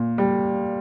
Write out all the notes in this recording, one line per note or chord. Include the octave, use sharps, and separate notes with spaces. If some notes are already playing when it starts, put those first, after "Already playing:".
Already playing: A#2
G3